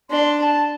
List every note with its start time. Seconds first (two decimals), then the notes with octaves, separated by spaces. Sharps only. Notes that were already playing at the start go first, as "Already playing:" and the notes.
0.10 D4 C6
0.41 A5